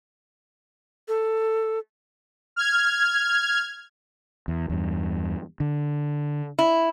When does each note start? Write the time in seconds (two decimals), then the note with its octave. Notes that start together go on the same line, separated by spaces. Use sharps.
1.08 A4
2.56 F6 G#6
4.48 E2
4.70 E2 G2
5.60 D3
6.59 E4